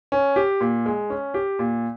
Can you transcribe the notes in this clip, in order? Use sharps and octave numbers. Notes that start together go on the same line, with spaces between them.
C#4
G4
A#2
G#3
C#4
G4
A#2